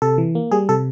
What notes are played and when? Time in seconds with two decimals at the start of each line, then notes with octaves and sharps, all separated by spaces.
0.02 C3 A4
0.18 E3
0.35 A#3
0.52 G3 G#4
0.69 C3 A4